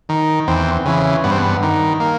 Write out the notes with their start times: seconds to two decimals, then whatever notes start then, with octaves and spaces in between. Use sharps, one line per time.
0.09 D#3
0.47 E2 C4
0.86 C#3 E3
1.24 G2 B3
1.31 C4
1.38 B3
1.63 D#3
2.00 A#3